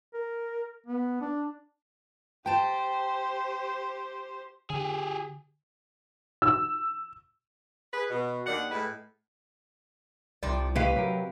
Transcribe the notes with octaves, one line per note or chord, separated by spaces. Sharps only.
A#4
B3
D4
G4 C5 G5 A5
D3 G4 G#4
E6
G#4 B4
B2
D#2 D#3 D4 F#5
A2 G#3 E4 B4
C2 C3 F3 D5
A2 C3 G4 B4 D#5 F5
C3 F#3 G4 A#4